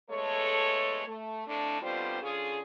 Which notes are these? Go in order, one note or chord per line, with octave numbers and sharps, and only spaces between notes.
E2 G#3 A3 A4 C#5
A3
F2 A2 A3 D4
B2 D3 G3 C4 F4 C5
D3 C#4 F4 G#4